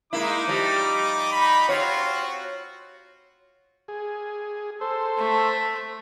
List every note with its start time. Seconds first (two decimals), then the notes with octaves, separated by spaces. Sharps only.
0.13 G#3 A#3 D#4 E4 D6
0.48 F3 G3
1.32 B5
1.69 C4 F4 F#4 C#5
3.88 G#4
4.81 A4 C5
5.18 A3